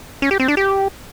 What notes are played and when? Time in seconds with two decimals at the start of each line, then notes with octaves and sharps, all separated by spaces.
0.22 C#4
0.31 G4
0.40 C4
0.48 D4
0.57 G4